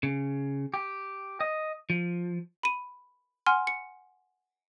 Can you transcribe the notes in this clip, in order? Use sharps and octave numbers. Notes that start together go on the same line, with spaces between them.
C#3
G4
D#5
F3
B5 D#7
F#5 G#5 C6 F6
C#7